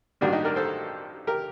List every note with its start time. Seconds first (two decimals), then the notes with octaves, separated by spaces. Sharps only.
0.21 A1 G2 D#3 G3 A#3 D4 F#4
0.33 D#4 G4
0.45 A#4 D5
0.56 A4 C5
1.27 G4 A#4